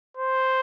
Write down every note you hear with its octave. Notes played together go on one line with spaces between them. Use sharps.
C5